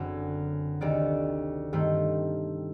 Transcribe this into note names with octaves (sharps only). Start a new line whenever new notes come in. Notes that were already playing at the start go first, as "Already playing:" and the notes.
Already playing: F#1 F#2 D3 F#3 C4
D2 C3 D#3 D5
G2 D#3 A3 C4